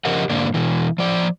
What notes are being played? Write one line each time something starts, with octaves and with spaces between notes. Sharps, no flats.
C#3 F3 G4 A#4 D#5 F#5
G#2 D3 A#3 D4
B2 E3
F3 D5